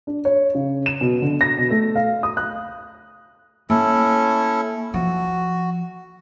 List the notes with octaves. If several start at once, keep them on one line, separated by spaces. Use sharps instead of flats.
D4
C#5
C#3
E7
B2
D3
A#6
B2
A3
F5
D#6
F#6
A#3 C#4 E4 A4
F3 F#4